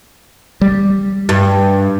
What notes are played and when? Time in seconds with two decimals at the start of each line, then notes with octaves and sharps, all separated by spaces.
0.61 G3
1.29 G2